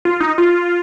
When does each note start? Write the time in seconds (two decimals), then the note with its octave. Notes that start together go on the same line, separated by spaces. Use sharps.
0.05 F4
0.20 D#4
0.38 F4